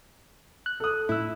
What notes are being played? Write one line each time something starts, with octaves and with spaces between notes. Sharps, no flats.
F#6
A4 D#6
A2 E4 E6